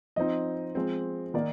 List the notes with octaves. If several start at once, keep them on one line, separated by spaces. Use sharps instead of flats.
F3 C4 D#4 D#5
F3 G#3 C4
D#3 A#3 D#4 D5